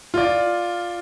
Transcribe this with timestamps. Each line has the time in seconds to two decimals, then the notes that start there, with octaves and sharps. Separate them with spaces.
0.14 F4 D5